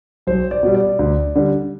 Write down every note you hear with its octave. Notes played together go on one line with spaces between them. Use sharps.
B1 C5
D5
B2 G3
D5
D2
D3 G3